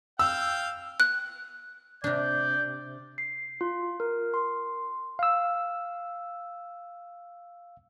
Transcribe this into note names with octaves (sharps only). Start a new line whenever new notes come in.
F5 G5 E6
F#6
C3 D4 D5 G6
C7
F4
A#4
C6
F5 E6